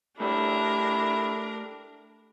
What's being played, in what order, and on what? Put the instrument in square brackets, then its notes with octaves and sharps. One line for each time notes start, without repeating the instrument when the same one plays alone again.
[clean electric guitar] A3 G4 D5 [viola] D4 A#4 [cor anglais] E4